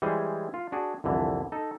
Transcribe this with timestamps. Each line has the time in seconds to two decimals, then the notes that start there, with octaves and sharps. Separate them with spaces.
0.02 E3 G3 G#3 G#4 C5
0.54 F4
0.72 D4 F#4 G#4
1.04 C2 F2 D3 E3
1.52 D#4 A4